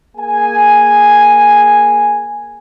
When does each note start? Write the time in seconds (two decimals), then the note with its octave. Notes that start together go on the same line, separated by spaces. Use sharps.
0.17 A#3 G#4 G#5